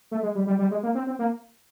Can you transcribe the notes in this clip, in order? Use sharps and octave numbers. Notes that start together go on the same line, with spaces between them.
A3
G#3
G3
G3
G3
G#3
A#3
C4
C4
A#3